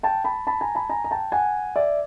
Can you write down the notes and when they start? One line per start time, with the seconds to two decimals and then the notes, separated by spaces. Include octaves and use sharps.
0.03 G5 A5
0.25 A5 B5
0.47 A5 B5
0.61 G#5 A#5
0.75 A5 B5
0.90 G#5 A#5
1.04 A#5
1.11 G5 A5
1.32 F#5 G#5
1.76 D5 E5